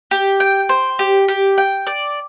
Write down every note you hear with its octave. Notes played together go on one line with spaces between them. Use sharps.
G4
G5
C5
G4
G4
G5
D5